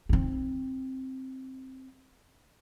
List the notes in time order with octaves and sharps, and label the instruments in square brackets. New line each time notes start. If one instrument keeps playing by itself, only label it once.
[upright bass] C4 D#4